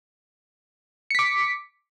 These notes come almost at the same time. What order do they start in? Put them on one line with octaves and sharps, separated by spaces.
C#7 B6 D6